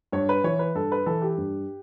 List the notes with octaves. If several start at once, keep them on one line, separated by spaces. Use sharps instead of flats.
G2 C#5
B4
E3 C#5
B4
G2 A4
B4
E3 A4
G4
G2